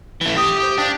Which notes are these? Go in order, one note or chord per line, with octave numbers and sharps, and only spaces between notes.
E3 A3
G4 D#6
C5
D4 F5